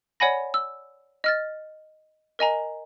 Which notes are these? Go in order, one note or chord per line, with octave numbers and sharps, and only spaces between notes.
C#5 D5 F#5 G#5 B5 A#6
E6
D#5 F6 A6
A#4 D#5 G#5 A#5